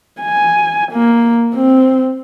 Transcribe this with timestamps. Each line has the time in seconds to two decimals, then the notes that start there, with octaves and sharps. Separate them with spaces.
0.21 G#5
0.92 A#3
1.54 C4